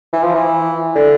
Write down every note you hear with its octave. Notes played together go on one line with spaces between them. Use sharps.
E3
F3
E3
D3